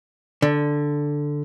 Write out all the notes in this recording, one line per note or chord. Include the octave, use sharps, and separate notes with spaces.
D3